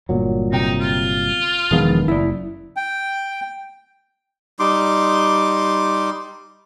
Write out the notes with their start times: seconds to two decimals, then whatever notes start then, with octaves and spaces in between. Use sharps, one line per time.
0.09 G1 A#2 F#3
0.52 C3 D#4 G5
0.81 F4
1.71 E1 D#3 F3 B3 G#4 F5
2.08 F#1 E4 D5
2.77 G5
4.59 G3 D#4 C6 D6